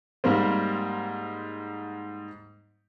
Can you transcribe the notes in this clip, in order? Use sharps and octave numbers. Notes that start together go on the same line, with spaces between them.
G#2 G3 A#3 C4